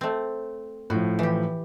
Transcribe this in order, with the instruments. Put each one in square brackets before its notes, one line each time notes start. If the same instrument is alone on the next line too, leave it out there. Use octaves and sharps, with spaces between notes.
[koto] A3 C4
[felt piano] A2 F3 [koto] F#4
[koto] E3 G4